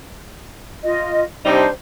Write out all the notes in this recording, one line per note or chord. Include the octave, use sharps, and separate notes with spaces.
F4 D#5
C3 G3 D4 D#4 C5